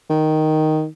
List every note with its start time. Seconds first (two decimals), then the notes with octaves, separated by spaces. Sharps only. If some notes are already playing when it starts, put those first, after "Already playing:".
0.10 D#3